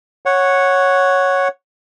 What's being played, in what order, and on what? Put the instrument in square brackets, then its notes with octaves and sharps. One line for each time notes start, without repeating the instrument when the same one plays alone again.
[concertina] C#5 F#5